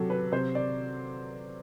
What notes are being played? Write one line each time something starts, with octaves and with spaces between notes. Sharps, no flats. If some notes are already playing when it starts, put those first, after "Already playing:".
Already playing: C3 F#3 G4 A4
B4
C3 C5
D5